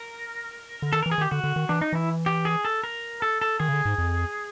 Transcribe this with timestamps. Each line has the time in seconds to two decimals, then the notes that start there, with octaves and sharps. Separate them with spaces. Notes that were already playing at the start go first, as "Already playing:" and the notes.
Already playing: A#4
0.82 D3
0.93 D#3 A4
1.03 E3 A#4
1.11 G#4
1.18 D#3 G4
1.31 D3 F#4
1.44 D3
1.56 D#3
1.69 E3 D4
1.81 D#4
1.93 E3 E4
2.26 G4
2.45 G#4
2.65 A4
2.84 A#4
3.22 A4
3.41 A4
3.60 D#3 G#4
3.68 C#3
3.73 D3
3.85 G#2
3.98 F2